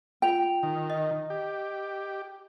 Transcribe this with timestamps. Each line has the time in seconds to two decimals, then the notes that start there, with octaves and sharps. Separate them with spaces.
0.22 F4 G5 F7
0.63 D#3
0.90 D#5
1.30 G4